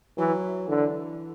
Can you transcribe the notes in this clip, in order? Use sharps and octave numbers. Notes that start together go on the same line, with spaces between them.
E3 F#3
D3 E3